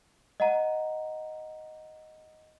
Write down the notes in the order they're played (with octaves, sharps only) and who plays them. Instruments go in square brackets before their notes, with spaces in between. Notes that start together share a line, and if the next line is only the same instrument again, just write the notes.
[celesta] D#5 F#5 A#5